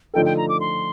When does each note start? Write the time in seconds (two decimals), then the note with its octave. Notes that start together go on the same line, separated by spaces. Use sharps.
0.14 D3 F3 A3 D#4 A4 G5
0.25 G5
0.37 A#5
0.49 D6
0.61 C6